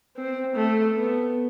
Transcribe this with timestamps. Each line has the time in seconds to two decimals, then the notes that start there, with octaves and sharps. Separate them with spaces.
0.16 C4
0.55 A3
0.95 B3